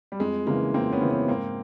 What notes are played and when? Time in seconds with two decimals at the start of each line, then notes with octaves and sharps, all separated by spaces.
0.12 G3
0.19 F2 G#3
0.47 C#3 E3 G#3 A#3
0.74 F2 A#3 C4
0.92 B3 C#4
1.01 C#3 E3
1.11 B3 C#4
1.28 G#2 A#3 C4